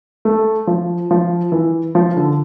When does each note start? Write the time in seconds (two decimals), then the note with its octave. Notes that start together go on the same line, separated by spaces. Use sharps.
0.25 A3
0.67 F3
1.11 F3
1.52 E3
1.95 F3
2.17 D3